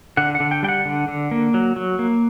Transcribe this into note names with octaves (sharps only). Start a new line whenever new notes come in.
D3 F#5
F#5
D3
G5
G3 G5
F#5
D3
D3
A#3
F#3
F#3
A#3